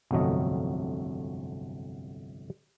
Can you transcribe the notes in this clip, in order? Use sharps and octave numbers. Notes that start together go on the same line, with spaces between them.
G1 C2 F2 F#3 A3 D#5